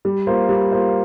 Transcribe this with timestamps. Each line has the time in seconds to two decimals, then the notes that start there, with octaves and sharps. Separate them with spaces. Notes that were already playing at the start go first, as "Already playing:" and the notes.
0.05 G3
0.27 A#3 F4 C5
0.49 G3
0.72 A#3 F4 C5